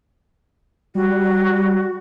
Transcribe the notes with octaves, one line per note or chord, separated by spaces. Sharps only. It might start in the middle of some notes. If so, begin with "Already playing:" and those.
G3 F#4